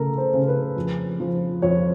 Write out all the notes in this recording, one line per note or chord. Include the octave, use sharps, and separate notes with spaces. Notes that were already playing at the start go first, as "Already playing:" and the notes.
Already playing: C#3 A3 A4 A#4
C5
C#3
B4
F2
F3
F2 C#5